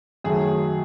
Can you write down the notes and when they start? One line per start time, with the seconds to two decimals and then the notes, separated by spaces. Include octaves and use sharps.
0.24 F#2 D#3 F#3 A3 G#4